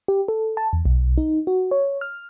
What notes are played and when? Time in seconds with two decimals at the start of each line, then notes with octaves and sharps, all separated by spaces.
0.08 G4
0.28 A4
0.57 A5
0.73 E2
0.85 B1
1.18 D#4
1.47 F#4
1.71 C#5
2.01 F6